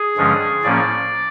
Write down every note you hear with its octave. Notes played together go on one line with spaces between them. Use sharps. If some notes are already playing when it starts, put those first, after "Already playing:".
Already playing: G#4
G2 D3 F3 G#3 C#4
A2 F3 A#3 C#4 D5